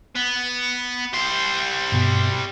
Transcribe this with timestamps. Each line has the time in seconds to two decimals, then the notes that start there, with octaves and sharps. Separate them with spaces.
0.16 B3
1.13 G3 C5
1.92 G2 B2